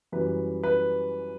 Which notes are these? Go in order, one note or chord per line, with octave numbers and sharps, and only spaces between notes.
F#2 E3 G3 B4
B4